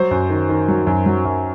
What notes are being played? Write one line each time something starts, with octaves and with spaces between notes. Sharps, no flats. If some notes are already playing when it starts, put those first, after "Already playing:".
Already playing: F#3 C5
F#2
D#3
D#3
F#3
F#2
F#3
F#2